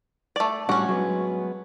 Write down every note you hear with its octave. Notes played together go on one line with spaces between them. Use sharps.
A3 D5
A2 G3 C#4 D4 F#4
F#3 G#3 B3